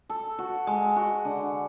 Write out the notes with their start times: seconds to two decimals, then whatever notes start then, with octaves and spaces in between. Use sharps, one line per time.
0.09 A4
0.39 F#4
0.67 G#3
0.96 F#4
1.25 D3